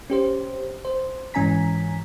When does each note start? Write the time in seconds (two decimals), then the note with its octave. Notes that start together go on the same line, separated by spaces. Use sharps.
0.10 C#4 G4 C5
0.85 C5
1.34 G#2 E3 C#4 G#5 A#5 B6